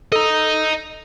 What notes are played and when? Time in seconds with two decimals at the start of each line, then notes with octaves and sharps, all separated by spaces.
0.12 A4 D#5 A#5